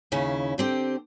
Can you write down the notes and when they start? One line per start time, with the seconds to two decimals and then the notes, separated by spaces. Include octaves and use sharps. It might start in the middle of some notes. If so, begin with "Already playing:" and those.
0.12 D#2 C#3 C#4 E4
0.58 D3 C4 G4